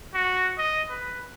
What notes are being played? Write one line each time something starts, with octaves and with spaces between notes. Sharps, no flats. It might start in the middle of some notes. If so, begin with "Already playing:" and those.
F#4
D#5
B4